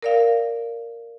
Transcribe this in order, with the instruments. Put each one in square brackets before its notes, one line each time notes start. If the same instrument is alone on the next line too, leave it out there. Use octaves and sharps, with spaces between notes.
[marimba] A#4 D5 F5